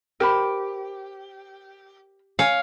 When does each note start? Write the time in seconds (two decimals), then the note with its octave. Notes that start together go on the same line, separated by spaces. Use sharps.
0.20 G4 A#4 C5 B5
2.39 C#5 F5 G#5